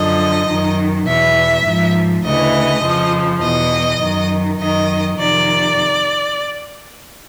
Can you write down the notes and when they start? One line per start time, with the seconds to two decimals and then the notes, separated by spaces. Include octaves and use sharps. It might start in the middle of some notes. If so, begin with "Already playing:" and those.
Already playing: F#2 D3 F3 D#5
0.48 F#2 D#3
1.06 E2 B2 E5
1.65 G#2 F3
2.24 D2 C#3 E3 D#5
2.83 F2 C#3 F3
3.41 E2 B2 D#5
4.00 F#2 D#3
4.58 F#2 D#3 D#5
5.18 F2 C3 D#3 D5